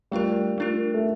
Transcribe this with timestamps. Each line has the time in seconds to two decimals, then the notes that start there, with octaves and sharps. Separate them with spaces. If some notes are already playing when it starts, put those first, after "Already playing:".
0.11 G3 A3 D4 F4 A#4
0.58 A3 D4 F4 A#4
0.94 A3